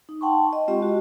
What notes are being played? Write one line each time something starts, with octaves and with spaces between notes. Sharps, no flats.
D#4
F#5 G5 A5 C6 C#6
D#5
G#3 C4 F4 G4 D#5
F#4